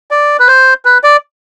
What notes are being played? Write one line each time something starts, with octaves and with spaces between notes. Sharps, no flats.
D5
B4
C5
B4
D5